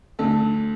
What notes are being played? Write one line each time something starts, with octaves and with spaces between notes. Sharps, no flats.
D2 A4
D3